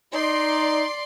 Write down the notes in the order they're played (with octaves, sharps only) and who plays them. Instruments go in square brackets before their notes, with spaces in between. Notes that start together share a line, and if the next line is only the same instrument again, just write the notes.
[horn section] D#4 [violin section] D5 C6